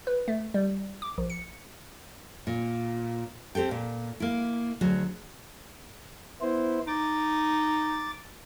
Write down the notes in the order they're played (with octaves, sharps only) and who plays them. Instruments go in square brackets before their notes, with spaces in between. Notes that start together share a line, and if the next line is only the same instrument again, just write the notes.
[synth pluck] B4
A3
G3
D6
A#1
C#7
[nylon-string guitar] A#2
C4 G4 A4 G5
A#2
A#3 E4
D2 F#3 G#4
[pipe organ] B3 E4 C5
[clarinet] D#4 [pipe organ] D6 A6